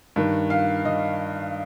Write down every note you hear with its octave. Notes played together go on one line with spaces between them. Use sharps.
G2 D#3
F5
D#3 D#5